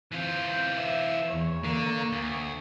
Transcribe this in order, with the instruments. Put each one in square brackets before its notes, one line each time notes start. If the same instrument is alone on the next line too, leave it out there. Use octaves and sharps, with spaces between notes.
[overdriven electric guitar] E3 F4 [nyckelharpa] C4 G5
[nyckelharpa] E5
[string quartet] E2 [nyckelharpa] C#5
[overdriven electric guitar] D3 [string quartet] A#3
[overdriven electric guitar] D2